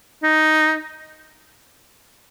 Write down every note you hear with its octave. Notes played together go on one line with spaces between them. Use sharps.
D#4